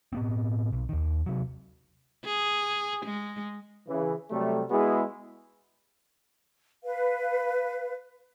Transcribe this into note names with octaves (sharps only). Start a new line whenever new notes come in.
A2 B3 C4
B1
D#2 D#3
C3 F#3
G#4
G#3
C#3 E3
C3 F#3 G3 A3
G#3 B3 E4 F#4 G#4
B4 F5